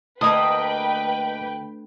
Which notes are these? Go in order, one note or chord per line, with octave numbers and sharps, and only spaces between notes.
D2 A#3 B4 D#5 G5 A5 D#6